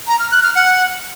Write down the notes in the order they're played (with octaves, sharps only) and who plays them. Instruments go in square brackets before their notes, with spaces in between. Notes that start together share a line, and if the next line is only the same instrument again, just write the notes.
[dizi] A#5
F6
F#6
F6
F#5